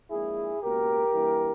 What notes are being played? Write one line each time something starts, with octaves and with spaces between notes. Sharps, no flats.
A#1 A#2 G#3 E4 G#4
C#2 B2 A#3 G4 A#4
G2 E3 A#3